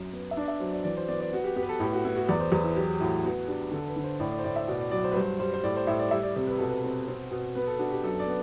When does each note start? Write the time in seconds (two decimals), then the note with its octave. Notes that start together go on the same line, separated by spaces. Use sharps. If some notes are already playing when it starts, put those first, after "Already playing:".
Already playing: F#2
0.13 B3
0.31 E5
0.37 D4 D5
0.48 E5
0.60 F#3 C5
0.73 D5
0.84 E3 D5
0.97 C5
1.08 B3 D5
1.21 D5
1.32 B3 F#4
1.44 G4
1.56 B3 G4
1.63 B4
1.69 A4
1.80 A2 G4
1.93 F#4
2.05 B3 E4
2.16 F#4
2.28 E2 D5
2.40 C5
2.52 E2 B4
2.64 E4
2.76 F#3 G4
3.00 A2 F#4
3.24 B3 F#4
3.48 D4 G4
3.71 D3 A4
3.88 B4
3.96 D3
4.04 C5
4.20 A2 D5
4.32 D5
4.39 C5
4.44 A2 D5
4.56 E5
4.68 B2 D5
4.79 D5
4.91 F#3 D5
5.04 C5
5.12 B4
5.15 G2 C5
5.39 G3 C5
5.54 C5
5.64 A2 D5
5.76 C5
5.87 A2 E5
6.00 D5
6.11 G3 E5
6.23 D5
6.35 C3 D5
6.47 B4
6.58 B2 A4
6.68 B4
6.84 C4
7.08 C4
7.31 B2
7.55 B3 B4
7.67 A4
7.79 D4 F#4
7.91 G4
8.03 F#2 A4
8.20 D5
8.27 B3